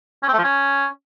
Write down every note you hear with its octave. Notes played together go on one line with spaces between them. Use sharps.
C#4
C4
A3
F3
C#4